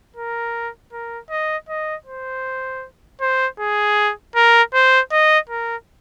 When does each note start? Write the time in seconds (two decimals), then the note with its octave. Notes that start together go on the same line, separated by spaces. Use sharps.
0.16 A#4
0.93 A#4
1.30 D#5
1.69 D#5
2.06 C5
3.21 C5
3.60 G#4
4.36 A#4
4.74 C5
5.12 D#5
5.49 A#4